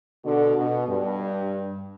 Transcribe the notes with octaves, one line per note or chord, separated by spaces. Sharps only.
B2 D3
B2
G2